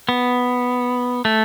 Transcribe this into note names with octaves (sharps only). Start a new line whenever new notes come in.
B3
A3